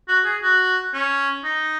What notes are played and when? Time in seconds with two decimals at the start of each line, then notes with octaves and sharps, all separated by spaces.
0.08 F#4
0.25 G#4
0.42 F#4
0.94 C#4
1.44 D#4